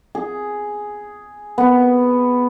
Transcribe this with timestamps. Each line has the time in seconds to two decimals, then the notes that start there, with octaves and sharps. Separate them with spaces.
0.15 G#4
1.58 B3